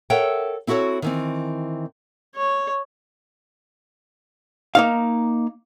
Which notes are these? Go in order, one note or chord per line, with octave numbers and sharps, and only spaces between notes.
A4 A#4 C#5 E5 F#5 G5
C4 E4 F#4 A4 C#5
D#3 E3 C4
C#5
A#3 D#4 F5